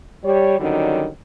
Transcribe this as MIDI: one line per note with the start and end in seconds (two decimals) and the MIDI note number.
0.24 0.59 55
0.24 0.59 67
0.24 0.59 73
0.59 1.08 50
0.59 1.08 51
0.59 1.08 54
0.59 1.08 55
0.59 1.08 61
0.59 1.08 63